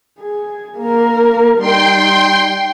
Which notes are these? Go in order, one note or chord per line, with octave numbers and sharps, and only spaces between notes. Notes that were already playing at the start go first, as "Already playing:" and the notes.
G#4
A#3 A#4
G3 D#4 G5 C6